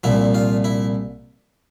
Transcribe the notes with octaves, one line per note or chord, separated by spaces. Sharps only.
C2 A#2 F3 E4
F4
E4